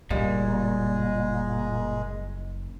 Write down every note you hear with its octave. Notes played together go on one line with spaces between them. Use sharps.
F#1 A#2 G3 G#3